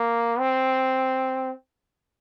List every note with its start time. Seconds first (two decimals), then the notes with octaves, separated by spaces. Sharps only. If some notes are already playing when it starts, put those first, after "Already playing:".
Already playing: A#3
0.39 C4